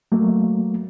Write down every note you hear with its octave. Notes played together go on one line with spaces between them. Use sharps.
F#3 A3 A#3